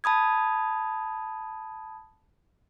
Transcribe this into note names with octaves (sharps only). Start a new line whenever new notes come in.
A5 B5 D#6 G#6